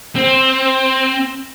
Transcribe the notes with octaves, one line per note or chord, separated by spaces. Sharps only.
C4